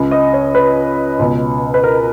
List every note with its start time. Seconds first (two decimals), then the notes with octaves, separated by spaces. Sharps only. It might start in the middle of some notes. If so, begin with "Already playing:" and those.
Already playing: C#2 C#3
0.11 D#5
0.33 C#5
0.55 B4
1.19 C#2 B2
1.74 B4
1.84 A#4